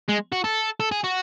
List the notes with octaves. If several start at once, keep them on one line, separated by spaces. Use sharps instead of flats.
G#3
F#4
A4
A4
G#4
F#4